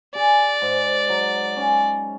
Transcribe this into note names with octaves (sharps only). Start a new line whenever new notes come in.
G#4 D5
G#2
F#3
C#4